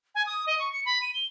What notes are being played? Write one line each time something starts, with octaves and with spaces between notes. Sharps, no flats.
G#5
D#6
D#5
C#6
C#7
B5
D#7
G7